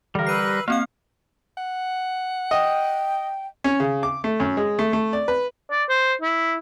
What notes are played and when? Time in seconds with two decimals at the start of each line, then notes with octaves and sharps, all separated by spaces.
0.15 D3 E3 G3 A#4
0.27 B4 E6 F#6 C7 D#7
0.68 A#3 C4 F#4 F5 F6
1.57 F#5
2.51 D#5 G5
3.64 C#4
3.80 C#3
4.03 D6
4.24 A3
4.40 F#2
4.57 G#3
4.79 A3
4.93 A3
5.13 D5
5.28 B4
5.71 D5
5.89 C5
6.21 E4